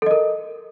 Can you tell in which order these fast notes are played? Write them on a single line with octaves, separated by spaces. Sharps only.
A4 D#5 A#4